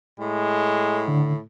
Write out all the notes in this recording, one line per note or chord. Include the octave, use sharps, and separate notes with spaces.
A2 G#3
D3